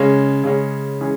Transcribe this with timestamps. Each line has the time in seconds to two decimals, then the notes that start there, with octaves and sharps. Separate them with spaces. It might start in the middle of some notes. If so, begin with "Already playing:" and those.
Already playing: C#3 G#3 C#4
0.44 C#3 G#3 C#4
1.01 E3 G#3 C#4 G#4